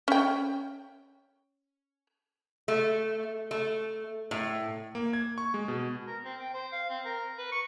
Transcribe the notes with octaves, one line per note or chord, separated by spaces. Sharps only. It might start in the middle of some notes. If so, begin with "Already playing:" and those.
C#4 G5
A3
A3
A2
A#3
G#6
C#6
G#3
B2
A#4
C4
G5
C5
F5
C4
A#4
B4
C#6